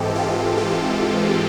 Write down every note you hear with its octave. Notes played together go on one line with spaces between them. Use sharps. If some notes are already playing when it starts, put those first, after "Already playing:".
Already playing: G#2 E3 G#3 C4 G4 A4
F4 G4
F4 G4